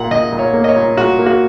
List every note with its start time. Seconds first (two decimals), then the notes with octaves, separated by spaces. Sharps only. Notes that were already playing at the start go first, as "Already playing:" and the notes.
Already playing: A#2 A#3 F#5
0.11 A#2 D#5
0.32 A#2
0.39 C#5
0.53 A#3
0.64 D#5
0.69 C#5
0.76 A#2
0.97 A#2 F#4
1.19 A#3
1.26 F#4